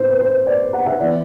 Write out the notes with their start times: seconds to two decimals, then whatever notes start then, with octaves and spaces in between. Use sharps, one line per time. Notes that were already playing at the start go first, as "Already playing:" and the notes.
Already playing: A2 C4 C5
0.10 B4
0.20 C5
0.47 D5
0.73 F#5
0.86 E5
1.00 E3 B3 D5